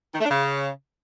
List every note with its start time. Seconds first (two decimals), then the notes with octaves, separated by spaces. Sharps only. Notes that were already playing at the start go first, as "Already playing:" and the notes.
0.14 D#3
0.20 A3
0.25 D4
0.31 C#3